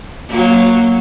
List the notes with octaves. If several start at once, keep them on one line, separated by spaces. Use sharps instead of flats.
F#3 A#3